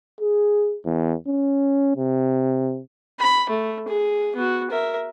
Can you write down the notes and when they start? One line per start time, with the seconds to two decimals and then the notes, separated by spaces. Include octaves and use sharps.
0.21 G#4
0.85 E2
1.28 C#4
1.97 C3
3.19 B5
3.49 A3
3.88 G#4
4.36 B3 F#4
4.71 A#4 E5